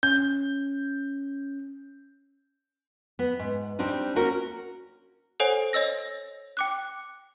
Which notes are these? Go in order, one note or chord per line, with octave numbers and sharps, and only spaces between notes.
C#4 G6
B3
G#2
G3 C4 D4 D#4
A#3 C#4 F#4 A#4
A4 C5 C#5 F#5 G#5
C#5 D#5 E6 A#6
G5 D6 F#6